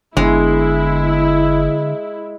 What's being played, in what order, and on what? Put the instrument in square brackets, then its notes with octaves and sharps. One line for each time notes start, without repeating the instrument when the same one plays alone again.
[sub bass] G1 [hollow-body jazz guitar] D3 B3 [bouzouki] G#3 [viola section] E4